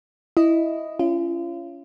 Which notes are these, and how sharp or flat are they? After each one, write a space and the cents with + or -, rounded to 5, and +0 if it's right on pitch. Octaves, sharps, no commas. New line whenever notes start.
E4 +0 D#5 +0
C#4 +10 F4 -40